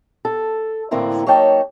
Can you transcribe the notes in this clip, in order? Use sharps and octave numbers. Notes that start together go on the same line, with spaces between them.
A4
A2 D3 E3 A#3 C4 E4
F#3 A#3 D#4 C#5 G5 A5